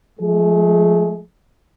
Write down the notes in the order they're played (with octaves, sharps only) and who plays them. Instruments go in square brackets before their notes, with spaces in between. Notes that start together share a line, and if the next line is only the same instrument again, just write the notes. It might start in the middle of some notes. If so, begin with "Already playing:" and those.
[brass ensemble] F3 G#3 A3 G#4